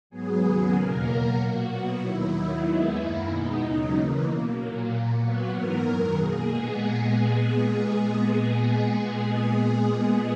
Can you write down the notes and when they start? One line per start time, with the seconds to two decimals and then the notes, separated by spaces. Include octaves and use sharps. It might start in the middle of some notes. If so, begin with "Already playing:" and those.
0.10 G#2 F#3 B3 G#4
0.42 D#2 C#3 F#3 B3 G#4
0.73 E2 B2 A#3 A#4
1.06 B2 F#3 A#3
1.37 A#2 A#3 F#4
1.69 B2 F#3 B3 F#4
2.00 D#2 D#3 F#3 E4
2.33 D#2 D#3 F#3
2.64 D#2 D#3 G#3 B3 E4
2.96 F#2 D#3 A#3
3.28 B2 G#3 B3 D#4
3.60 D#2 C#3 F#3 D#4
3.91 E2 C#3 E3 A#3
4.23 B2 A#3
4.55 A#2 F#3 A#3
4.86 A#2 A#3
5.17 A#2 F#3 B3 F#4
5.49 G#2 E3 B3 A#4
5.81 F#2 D#3 F#3
6.13 B2 A#3 G#4
6.44 A#2 G#3 B3